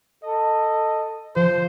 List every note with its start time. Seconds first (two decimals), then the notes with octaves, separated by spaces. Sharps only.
0.24 A4 D#5
1.36 F3 C5